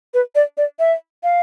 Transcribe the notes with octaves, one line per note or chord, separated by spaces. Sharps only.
B4
D5
D5
E5
F5